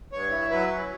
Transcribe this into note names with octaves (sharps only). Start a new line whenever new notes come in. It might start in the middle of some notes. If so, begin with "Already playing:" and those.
G2 C#5
E4
F#3 B4
C#4